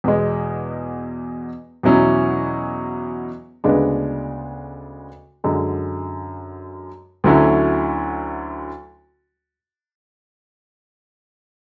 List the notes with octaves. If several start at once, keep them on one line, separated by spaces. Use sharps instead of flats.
E2 B2 G#3
E2 B2 F#3 C#4 E4
D2 C#3 G#3 B3 D4
F#2 D3 G#3
D2 D3 F#3 C#4 E4